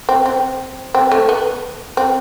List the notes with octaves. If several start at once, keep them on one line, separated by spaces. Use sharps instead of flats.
C4
C4
C4
A3
B3
C4